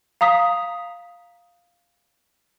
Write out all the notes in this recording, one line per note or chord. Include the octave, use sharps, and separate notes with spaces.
F5 A#5 D#6 B6